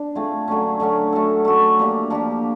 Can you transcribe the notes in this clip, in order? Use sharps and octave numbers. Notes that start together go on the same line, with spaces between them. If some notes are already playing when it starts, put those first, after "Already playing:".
Already playing: D4
A3 C4 F4 G#4
D3 F#3 A3 C#4
D3 F#3 A3 C#4
A3 C#4 F#4 A4
A3 C#4 F#4 A4
F3 A#3 D4 G4
F3 A#3 D4 G4